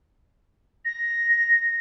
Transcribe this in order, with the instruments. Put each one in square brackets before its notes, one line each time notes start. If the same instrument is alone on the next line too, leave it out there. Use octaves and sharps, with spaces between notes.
[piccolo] A#6